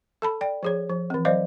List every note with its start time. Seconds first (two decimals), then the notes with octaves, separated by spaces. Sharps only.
0.22 A4 A5 B5
0.41 D5 G5
0.63 F3 G#4 C#5
0.90 F3
1.10 E3 C4
1.25 F#3 C5 D5 D#5 F5